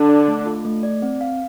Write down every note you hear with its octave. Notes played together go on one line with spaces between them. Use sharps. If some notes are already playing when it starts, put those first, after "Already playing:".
Already playing: D3 D4
D5
A3
F4
A3
D5
C4
F5